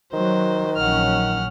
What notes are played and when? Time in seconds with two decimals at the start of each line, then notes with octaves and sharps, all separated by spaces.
0.13 D#3 F#3 C5
0.77 A#1 F#3 C#4 F#5 F6